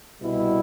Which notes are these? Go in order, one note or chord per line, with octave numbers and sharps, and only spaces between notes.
C2 B2 G3 E4